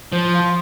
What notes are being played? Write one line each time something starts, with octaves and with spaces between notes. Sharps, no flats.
F3 C5
F4